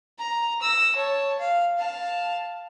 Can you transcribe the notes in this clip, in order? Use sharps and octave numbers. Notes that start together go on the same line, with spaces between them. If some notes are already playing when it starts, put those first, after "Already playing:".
A#5
E6 A#6
C#5 A5
F5
F5 A5